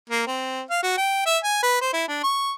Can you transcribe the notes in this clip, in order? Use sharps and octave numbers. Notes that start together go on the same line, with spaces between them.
A#3
C4
F5
F#4
G5
E5
G#5
B4
C5
E4
D4
C#6